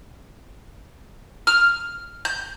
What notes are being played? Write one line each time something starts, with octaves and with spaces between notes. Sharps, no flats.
F6
G6